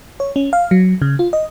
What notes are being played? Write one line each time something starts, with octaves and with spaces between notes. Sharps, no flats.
C#5
C#4
F5
F#3
C#3
F4
D#5